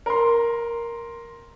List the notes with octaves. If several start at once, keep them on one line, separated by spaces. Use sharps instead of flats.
A#4 C6